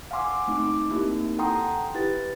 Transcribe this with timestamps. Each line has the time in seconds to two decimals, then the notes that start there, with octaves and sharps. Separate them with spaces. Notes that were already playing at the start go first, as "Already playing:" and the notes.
0.11 F5 F#5 G#5 C6 D6 E6
0.47 A3 C4 D#4 D6
0.91 A#3 C4 D#4 E4 G4
1.39 A4 F#5 G5 A#5 C6 D#6
1.95 E4 G4 B4 A6